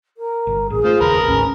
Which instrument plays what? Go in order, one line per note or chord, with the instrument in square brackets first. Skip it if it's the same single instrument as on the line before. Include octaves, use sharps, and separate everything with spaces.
[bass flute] A#4
[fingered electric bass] G1
[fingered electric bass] A1 [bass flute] G#4
[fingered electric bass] A3 [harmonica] F4 C5
[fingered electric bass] F#1 D#2 C#3 [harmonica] A#4 B4 A5
[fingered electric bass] G#1 D2 G#2 [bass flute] C#4